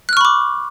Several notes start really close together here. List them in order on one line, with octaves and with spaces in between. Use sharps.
F#6 F6 C#6 B5 D6